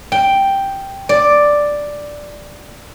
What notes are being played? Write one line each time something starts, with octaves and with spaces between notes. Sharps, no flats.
G5
D5